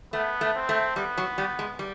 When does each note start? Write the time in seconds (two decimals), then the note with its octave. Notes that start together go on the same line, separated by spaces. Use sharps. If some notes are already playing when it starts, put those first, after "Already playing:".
0.13 A3 B3
0.41 A3
0.55 C4
0.69 A3
0.96 G3 B3
1.18 F#3
1.38 G3
1.59 G#3
1.79 G3